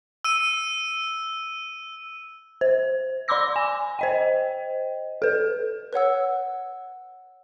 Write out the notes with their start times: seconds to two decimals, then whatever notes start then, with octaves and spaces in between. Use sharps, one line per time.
0.24 E6 D#7
2.61 C5
3.28 D5 B5 C6 D6 E6 A#6
3.56 G#5
3.99 C5 D#5 G5
5.22 A4 B4
5.93 B4 C#5 F#5 E6